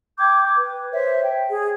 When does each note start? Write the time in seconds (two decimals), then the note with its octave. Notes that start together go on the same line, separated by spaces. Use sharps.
0.19 G5 D6 G6 G#6
0.45 D6
0.59 B4
0.93 C5 C#5 E5
1.23 G5
1.49 G#4